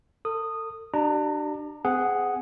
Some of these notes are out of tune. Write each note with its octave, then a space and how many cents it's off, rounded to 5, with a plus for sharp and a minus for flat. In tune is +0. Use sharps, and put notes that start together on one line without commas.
A4 +35 D#6 -10
D4 +30 G4 -40 A#5 +0
C4 -35 G#4 +0 F#5 +0